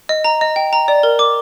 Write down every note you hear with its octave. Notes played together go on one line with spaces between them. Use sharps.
D#5
A#5
D#5
G5
A#5
D5
A#4
D6